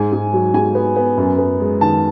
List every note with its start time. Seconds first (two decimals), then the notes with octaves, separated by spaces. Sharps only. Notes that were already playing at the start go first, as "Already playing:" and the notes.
Already playing: G#2 G#3 G#5
0.13 G#2
0.33 F#3
0.54 G#2 G#5
0.75 B3
0.96 B3
1.18 F#2
1.38 B3
1.60 G#3
1.81 D#3 A5